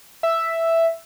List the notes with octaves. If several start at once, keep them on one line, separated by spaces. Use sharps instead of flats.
E5